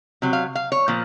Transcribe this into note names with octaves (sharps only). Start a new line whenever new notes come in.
C3 F#3
F5
F5
C#5
A#2 F3